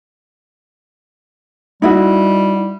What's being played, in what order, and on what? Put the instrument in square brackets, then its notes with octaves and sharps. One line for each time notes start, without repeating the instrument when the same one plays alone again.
[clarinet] G3 [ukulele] D#4 E4 F#4